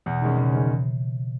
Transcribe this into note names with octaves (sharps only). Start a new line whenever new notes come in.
E2 B2
B2 D#3 G#3 C#4
E2 C#3
D#3 E3 G#3 C#4